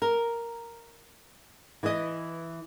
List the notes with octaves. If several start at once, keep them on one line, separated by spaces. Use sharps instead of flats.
A#4
E3 E4 B4 D#5